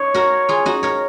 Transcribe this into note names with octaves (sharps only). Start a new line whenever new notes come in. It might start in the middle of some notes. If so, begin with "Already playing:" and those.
Already playing: D#4 C#5
F#4 A#4
F4 G#4
D#4 F#4
A#4 C#5